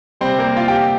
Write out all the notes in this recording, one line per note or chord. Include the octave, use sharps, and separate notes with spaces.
C3 G3 C4 C5
A#3 A#4
F4 F5
G4 G5